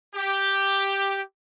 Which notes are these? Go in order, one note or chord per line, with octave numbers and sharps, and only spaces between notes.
G4